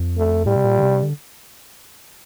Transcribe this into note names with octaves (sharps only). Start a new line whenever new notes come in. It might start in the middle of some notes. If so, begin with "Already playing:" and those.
Already playing: F2
A3
A2 G3
C3
A#2
D3
C3
D3